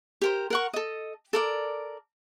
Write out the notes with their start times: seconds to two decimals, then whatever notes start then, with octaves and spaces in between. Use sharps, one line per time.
0.21 G4 A#4 C5
0.50 A#4 F#5 C#6
0.73 A4 D#5
1.33 A4 A#4 D5